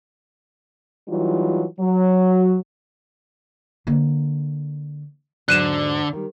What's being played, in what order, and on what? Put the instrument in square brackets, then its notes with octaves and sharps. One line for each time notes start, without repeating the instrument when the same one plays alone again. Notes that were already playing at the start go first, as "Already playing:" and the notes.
[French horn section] E3 F#3 G3 D#4 F4
F#3
[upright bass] D3 A#3
[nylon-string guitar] E2 G#2 F#3 [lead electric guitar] D3 [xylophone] F#6 D#7 E7
[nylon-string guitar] D#3 G3